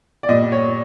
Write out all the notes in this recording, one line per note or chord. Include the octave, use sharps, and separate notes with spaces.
D5
A#2 G3 D#5
C#5